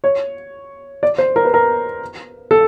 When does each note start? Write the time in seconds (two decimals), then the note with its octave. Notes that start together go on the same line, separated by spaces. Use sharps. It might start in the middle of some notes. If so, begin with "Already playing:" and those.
0.04 C#5
1.03 D5
1.18 C5
1.36 A#4
1.45 B4
1.54 A#4
2.51 A4